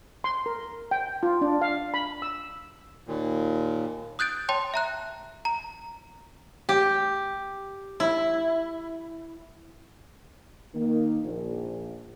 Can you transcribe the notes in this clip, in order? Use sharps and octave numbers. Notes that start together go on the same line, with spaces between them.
C6
A#4
G5
F4
D4
F5
B5
E6
D#2 A#2
D#6 F#6 G6 A6 D7
C#5 G5 A5 C6
E5 A#5 F#6
A#5
G4
E4
D#3 A#3
A#1